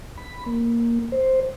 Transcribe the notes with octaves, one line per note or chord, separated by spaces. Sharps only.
B5
A#3
C5